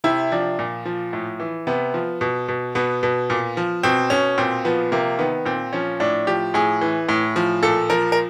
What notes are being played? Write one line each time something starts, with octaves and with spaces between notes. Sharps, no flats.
C3 E4
F3 D4
A#2
F3
A2
E3
C3 B3
F3
B2
B2
B2 B3
B2
A#2
F3
B2 C4
B2 C#4
A#2 C4
F3 B3
C3 A#3
D#3 B3
A#2 C4
F3 C#4
A2 D4
F3 G4
A2 G#4
E3
A2
F3
A#2 A4
F3 A#4
A#4